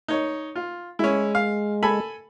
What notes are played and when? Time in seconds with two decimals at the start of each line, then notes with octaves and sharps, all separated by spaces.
0.08 D#4 C#5
0.56 F4
0.99 G#3 C#4 E4
1.35 F5
1.83 A4 G#5 B5